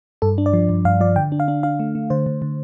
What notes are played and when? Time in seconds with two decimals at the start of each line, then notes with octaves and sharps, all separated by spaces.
0.22 G2 A4
0.38 D4
0.46 D5
0.53 F3
0.69 G2
0.85 G2 F5
1.01 F3 D5
1.16 D3 G5
1.32 D4
1.40 F5
1.48 D4
1.63 D4 F5
1.80 A3
1.95 A3
2.10 D3 C5
2.26 D3
2.42 D3